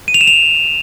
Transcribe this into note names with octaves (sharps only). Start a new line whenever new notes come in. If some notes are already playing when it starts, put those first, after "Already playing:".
D#7
F7
E7
F7